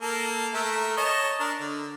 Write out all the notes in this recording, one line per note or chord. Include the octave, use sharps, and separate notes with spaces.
A#3 A4
A3 A#4 E5
C#5 D#5 A5
D4 A#4
D3